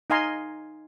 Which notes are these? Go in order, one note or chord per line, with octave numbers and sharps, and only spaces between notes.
D#4 D#5 F5 G#5 A#5 C6